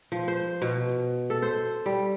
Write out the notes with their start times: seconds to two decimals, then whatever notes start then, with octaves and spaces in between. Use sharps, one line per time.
0.12 F3
0.28 C5
0.62 B2
1.30 A4
1.42 C5
1.86 G3